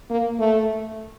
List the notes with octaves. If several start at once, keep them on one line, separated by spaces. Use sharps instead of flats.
A#3
A3